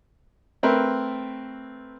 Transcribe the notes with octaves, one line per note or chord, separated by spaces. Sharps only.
A3 C4 A#4 B4 E5 F#6